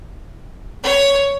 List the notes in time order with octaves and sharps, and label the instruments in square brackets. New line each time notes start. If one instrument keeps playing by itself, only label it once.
[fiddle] C#5